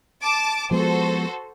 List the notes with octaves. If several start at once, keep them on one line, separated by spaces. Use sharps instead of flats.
A5 D6
F3 G#3 B3 F#4 A4 C5